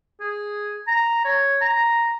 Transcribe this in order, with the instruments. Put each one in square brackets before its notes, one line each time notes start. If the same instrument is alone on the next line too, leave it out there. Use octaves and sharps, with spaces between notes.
[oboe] G#4
A#5
C#5
A#5